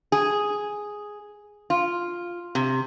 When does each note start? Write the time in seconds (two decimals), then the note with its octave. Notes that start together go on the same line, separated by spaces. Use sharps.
0.12 G#4
1.70 F4
2.55 C3